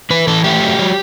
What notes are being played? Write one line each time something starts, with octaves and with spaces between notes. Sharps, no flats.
E3 B4
E3 A4
A3 G4
F#3
F#3